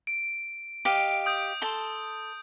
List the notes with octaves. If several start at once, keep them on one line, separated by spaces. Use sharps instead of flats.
D7
G4 D#5 F5
D#6 G6
A4 A5 C6